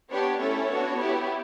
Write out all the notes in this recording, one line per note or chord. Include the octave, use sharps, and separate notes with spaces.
B3 D4 G4 C#5
A3 C#4 E4 A4 C#5
B3 D4 F#4
B3 E4 G4